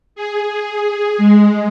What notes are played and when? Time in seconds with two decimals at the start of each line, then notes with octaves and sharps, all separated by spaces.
0.15 G#4
1.18 G#3